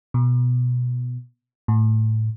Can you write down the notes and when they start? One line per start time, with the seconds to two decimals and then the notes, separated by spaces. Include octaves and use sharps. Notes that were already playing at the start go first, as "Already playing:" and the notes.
0.14 B2
1.68 A2